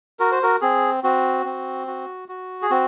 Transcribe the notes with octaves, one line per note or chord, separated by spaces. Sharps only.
F#4 A#4
C5
F#4 A#4
C4 G#4
C4 F#4
C4
F#4
F#4
G#4
C4 F#4